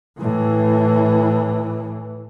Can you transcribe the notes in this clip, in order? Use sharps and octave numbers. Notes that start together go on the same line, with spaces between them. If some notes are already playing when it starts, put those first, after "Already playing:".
A2 E3